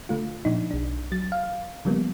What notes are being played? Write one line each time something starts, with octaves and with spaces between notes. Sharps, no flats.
D3 A3 F4
A#2 F3 D4 D#4
B1 D4
F#3 A6
F5
C#3 F3 G3 A#3 B3